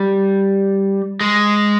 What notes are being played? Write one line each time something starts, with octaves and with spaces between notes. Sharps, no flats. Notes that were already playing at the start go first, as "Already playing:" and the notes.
Already playing: G3
G#3